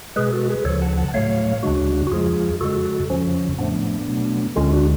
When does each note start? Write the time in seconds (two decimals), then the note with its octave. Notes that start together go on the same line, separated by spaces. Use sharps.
0.16 B2 G#3 G#4 B4
0.33 F#4 A4
0.49 G#4 B4
0.65 D2 C#3 F3 A4 C#5
0.82 F#5 A5
0.97 F#5 A5
1.14 A2 F#3 A3 C#5 F5
1.63 D2 C#3 G#3 D4 F#4
2.07 F#4
2.12 F2 F3 G#3 F4 G#4
2.61 F2 C#3 G#3 F#4 A4
3.10 F2 C#3 F3 C#4
3.58 A2 F3 A3 B3 D4
4.08 B2 F#3 A3
4.56 D2 D3 G#3 C#4 F4
4.73 D4 F#4